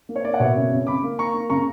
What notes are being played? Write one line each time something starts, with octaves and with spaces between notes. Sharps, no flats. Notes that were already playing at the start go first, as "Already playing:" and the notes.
A#3
C#5
A#3 D5
F#5
B2 C#5 E5
C#3
C#3
C#3 B5 D6
A#3
A#3 A#5 C#6
A#3
C#3 A#5 C#6